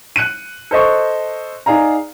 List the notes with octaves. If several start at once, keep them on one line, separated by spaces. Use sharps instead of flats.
F#6 C#7 D#7
A4 C5 D#5 C#6
D#4 G#4 D5 F5 A#5